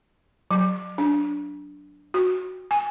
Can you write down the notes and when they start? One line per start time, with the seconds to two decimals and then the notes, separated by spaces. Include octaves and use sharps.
0.51 F#3
0.98 D4
2.14 F#4
2.71 G#5